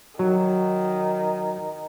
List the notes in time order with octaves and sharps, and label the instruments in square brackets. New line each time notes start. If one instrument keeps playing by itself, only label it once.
[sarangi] D#3 [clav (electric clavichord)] F#3